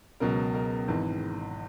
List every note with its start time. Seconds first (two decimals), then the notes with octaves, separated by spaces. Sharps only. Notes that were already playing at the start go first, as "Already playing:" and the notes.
0.20 C#2 B2 F#3 A#4
0.54 A#4
0.88 G#1 G#2 E3